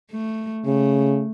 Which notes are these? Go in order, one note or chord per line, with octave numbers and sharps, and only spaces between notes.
A3
C#3 A3